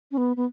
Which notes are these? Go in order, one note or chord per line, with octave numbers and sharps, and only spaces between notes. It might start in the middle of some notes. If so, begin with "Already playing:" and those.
C#4
B3
B3